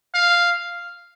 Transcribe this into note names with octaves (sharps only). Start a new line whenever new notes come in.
F5